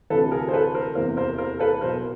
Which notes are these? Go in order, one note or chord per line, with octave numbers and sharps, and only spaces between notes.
D2 C3 E3 A4 B4
G#4 A#4
C5
A4 B4
A#4 C5
F#1 E2 C3 E3 A#4 C5
A#4 C5
A#4 C5
A4 B4
B1 B2 A#4 C5